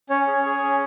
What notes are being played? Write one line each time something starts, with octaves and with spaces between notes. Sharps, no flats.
C#4 C#5
G#4
G#4
C#4